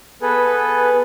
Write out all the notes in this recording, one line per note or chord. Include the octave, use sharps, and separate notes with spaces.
B3 G#4 A4 B4